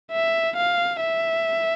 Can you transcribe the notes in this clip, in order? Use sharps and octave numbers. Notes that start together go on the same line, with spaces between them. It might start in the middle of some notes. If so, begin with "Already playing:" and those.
E5
F5
E5